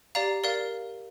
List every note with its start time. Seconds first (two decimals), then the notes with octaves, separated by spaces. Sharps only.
0.15 G4 D5 F5 A#5
0.44 A#4 D5 F5